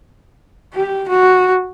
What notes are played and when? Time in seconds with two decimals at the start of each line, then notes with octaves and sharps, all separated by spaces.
0.74 G4
1.08 F#4